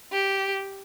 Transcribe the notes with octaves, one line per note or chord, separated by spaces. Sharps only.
G4